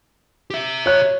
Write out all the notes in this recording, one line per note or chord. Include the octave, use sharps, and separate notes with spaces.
G4 E5
C#5 F#6